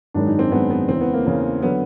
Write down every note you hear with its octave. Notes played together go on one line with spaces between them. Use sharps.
G#1 F#2 D#3 G#3 D4
D#4
C4
G#1 F#2 D#3 G#3 B3
B3
E2 C#3 E3 C4
B3
A#3
E2 C#3 E3
D3 F#3 B3